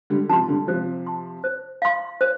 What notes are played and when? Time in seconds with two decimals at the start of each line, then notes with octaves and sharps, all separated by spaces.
0.10 D3 G3
0.29 C3 F3 A5
0.33 C6
0.48 D3 G3
0.67 C3 F3 C5
1.06 A5 C6
1.44 C5
1.82 F5 C6
2.21 C5